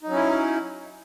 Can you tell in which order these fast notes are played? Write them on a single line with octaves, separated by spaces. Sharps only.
D#4 F#3 C#4 E4